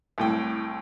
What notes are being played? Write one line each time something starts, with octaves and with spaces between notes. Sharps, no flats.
C2 A2 G5